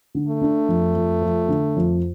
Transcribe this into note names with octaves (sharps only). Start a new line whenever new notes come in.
D3
A3
D4
F2
F2
F3
D3
F2